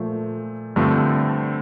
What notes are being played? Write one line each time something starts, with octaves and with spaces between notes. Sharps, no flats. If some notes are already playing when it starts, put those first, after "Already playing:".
Already playing: A#2 F3 A3
G2 D3 F3 A3 C4